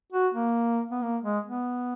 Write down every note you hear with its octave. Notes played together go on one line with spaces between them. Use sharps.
F#4
A#3
B3
A#3
G#3
B3